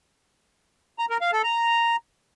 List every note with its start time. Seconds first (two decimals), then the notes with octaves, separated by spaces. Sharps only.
0.99 A#5
1.10 A#4
1.21 F5
1.32 A4
1.44 A#5